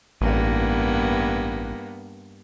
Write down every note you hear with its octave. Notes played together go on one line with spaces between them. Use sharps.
A1 G2 A#3 B3